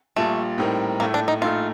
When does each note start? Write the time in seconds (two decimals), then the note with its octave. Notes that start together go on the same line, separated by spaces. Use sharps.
0.16 A#1 A#2 G3 A3
0.58 A2 G3 C4 D#4 A#4
1.00 A#1 A2 A3 A#3
1.14 D4
1.28 D#4
1.41 A#1 A2 A3 D#4 F4 A4